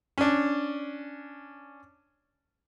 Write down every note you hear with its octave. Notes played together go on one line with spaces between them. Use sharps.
C#4 D4